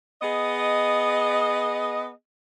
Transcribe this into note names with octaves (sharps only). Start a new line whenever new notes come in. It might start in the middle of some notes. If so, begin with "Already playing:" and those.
B3 G#4 D#5